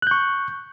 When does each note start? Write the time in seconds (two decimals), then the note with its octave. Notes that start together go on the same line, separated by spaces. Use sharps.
0.02 F#6
0.07 G6
0.11 C#6